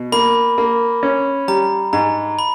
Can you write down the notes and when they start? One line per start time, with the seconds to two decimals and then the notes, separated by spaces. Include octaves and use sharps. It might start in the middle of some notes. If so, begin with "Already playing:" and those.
Already playing: B2
0.12 A#3 B5
0.58 A#3
1.03 C#4
1.48 G3 A#5
1.93 G#2 A#5
2.39 B5